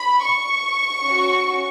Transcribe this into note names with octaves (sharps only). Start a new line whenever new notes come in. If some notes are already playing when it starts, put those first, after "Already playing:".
Already playing: B5
C#6
C#4 F#4